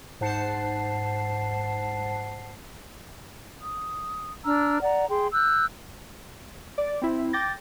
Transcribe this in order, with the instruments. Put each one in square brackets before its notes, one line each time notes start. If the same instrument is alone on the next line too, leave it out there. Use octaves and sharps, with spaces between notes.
[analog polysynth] G#2 C5 F#5 A5 C7
[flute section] D#6
D4 A#5 E6 F6
D5 F#5 A#5
G#4 G5 C6
E6 F#6 G6
[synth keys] D5
C4 E4
G5 D6 G6 A6 A#6